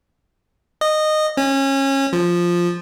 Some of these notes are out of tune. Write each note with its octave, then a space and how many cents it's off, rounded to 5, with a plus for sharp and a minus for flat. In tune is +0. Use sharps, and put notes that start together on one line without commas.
D#5 -15
C#4 -25
F3 +0